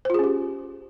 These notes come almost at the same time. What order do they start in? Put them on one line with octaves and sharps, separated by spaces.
C5 F4 G#4 C#4 G4